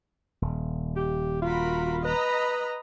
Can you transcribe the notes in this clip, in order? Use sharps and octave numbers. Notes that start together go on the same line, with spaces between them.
D#1
G4
F4 F#4 A#4 B5
B4 D#5 A#5 B5